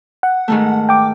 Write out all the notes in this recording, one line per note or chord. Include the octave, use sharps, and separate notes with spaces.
F#5
G#2 D#3 A3
G5 D6